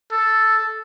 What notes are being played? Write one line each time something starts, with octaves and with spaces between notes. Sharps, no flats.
A4